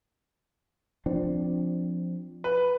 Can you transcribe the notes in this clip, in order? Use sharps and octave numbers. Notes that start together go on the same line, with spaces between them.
F3 C4 D4
B4